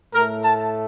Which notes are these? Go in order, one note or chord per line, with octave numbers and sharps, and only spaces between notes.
A2 A3 A#4
A5